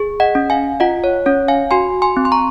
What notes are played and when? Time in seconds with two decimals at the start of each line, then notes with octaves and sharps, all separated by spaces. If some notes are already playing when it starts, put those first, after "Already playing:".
Already playing: G#4
0.20 D#5 F#5
0.35 C#4
0.50 F5 G#5
0.80 F4 D#5 F#5
1.04 C#5
1.26 C#4 C#5
1.48 F5 G#5
1.71 F#4 G#5 C6
2.02 G#5 C6
2.17 C4
2.25 C6
2.32 A#5 C#6